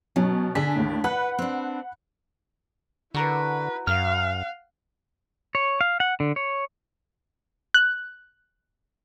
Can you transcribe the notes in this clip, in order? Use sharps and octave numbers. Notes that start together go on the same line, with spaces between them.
B2 F#3 C#4
D3 D4 G#4 B6
D#2 A2
B4 F#5 B5 F#6
C4 D4
D3 E4 F#4 A#4 B4 C#6
F#2 F5 F#5 F6
C#5
F5
F#5
D3
C#5
F#6